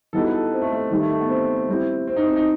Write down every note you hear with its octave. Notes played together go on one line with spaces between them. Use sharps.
E3 G3 B3 D#4 F#4 A4
B4
A4
C4
A3
A3
D#3 G3 D#4
A3
A3
B3
C4
G3 C4 E4
C4
D#4
C4
D#4